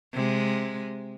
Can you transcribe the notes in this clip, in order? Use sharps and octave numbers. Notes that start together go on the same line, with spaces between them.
C3 G#3